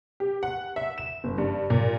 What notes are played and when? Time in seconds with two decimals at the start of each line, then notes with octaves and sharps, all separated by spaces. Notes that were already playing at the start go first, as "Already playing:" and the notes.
0.20 G4
0.43 F#5
0.76 E5
0.98 E7
1.24 F#1
1.38 G2
1.70 A#2